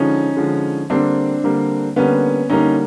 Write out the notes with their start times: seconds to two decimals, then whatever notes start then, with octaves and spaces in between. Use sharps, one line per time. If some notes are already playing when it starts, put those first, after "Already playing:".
Already playing: D3 F3 G#3 C#4 D#4
0.36 D3 F3 G#3
0.90 D3 G3 A#3 C4 D4
1.44 D3 G3 A#3
1.96 D3 G3 A#3 B3 C#4
2.50 D3 G3 A#3 C#4 D#4